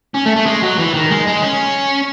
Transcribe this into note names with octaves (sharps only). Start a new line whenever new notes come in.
C#4
A3
A3
G#3
F#3
E3
D#3
G#3
G#3
C#4